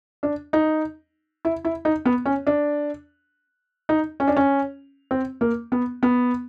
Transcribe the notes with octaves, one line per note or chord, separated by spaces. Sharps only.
D4
D#4
E4
E4
D#4
B3
C#4
D4
D#4
C#4
D4
C#4
C4
A#3
B3
B3